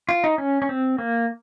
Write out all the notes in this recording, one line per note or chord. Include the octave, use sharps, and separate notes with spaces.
F4
D#4
C#4
C#4
C4
A#3